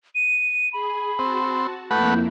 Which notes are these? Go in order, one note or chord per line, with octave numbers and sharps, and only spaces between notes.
D#7
G#4 B5
C4 F#4 A5
F2 A3 A#3 E4 B4 F#5 G6